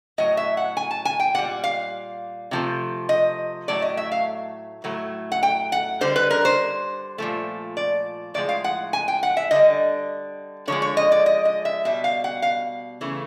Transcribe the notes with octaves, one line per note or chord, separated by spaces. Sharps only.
A2 F#3 D#5
E5
F#5
G#5
A5
G#5
G5
A#2 G3 F#5
F5
C3 F3 A3
D#5
A2 F#3 A3 D5
D#5
E5
F5
A2 F#3 A3
F#5
G5
F#5
D3 G3 C5
B4
A#4
C5
A#2 F3 A3
D5
A2 F3 G#3 D5
F5
F#5
G#5
G5
F#5
E5
D3 G3 D#5
D3 F3 G#3 C#5
C#5
D#5
D5
D#5
D#5
E5
B2 G3 E5
F5
F#5
F5
C#3 E3 A3